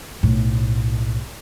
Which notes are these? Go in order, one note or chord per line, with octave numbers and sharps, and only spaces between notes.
B1 A2